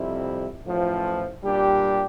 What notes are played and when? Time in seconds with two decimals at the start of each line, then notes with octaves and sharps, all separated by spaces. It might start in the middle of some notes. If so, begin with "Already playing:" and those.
Already playing: F2 C3 G3 C4 E4
0.65 A1 A2 F3
1.43 A#2 G3 D4 G4